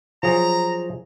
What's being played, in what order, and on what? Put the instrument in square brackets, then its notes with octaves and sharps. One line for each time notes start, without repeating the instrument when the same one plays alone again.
[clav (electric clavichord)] F3 F#3 G#4 [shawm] A#5